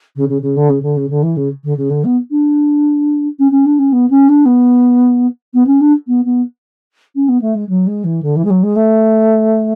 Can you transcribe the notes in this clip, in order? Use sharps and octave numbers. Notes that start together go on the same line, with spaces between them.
C#3
C#3
C#3
D3
C#3
D3
C#3
D3
E3
C#3
D3
C#3
D3
B3
D4
C#4
C#4
D4
C#4
B3
C#4
D4
B3
B3
C#4
D4
B3
B3
C#4
B3
A3
G#3
F#3
G#3
E3
D3
E3
G#3
F#3
G#3
A3